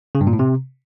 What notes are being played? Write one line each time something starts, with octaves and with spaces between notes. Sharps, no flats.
C#3
G2
A#2
A2
C3